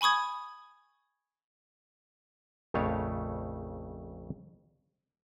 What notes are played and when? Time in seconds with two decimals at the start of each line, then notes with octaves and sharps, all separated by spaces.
0.01 G#5 B5 C#6 D#6 G#6
2.74 A#1 F2 C#3 A3 C#5 F5